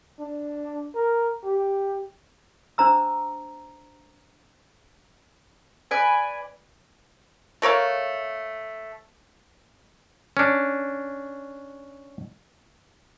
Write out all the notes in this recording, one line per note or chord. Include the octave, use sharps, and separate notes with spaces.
D4
A#4
G4
D4 C5 A#5 E6
B4 D5 G#5
A3 A#4 C#5 F5
C#4 D4